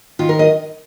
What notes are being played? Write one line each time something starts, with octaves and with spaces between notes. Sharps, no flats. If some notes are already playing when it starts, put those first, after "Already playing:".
D#3 F4
A#4
D#5